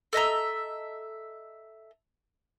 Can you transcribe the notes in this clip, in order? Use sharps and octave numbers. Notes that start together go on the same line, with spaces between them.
A4 D#5 E5 A#5